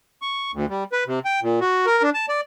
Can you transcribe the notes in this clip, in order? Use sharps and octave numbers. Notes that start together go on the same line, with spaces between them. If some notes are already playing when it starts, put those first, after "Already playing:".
C#6
D2
G3
B4
C3
G5
A#2
F#4
A#4
D4
A5
D5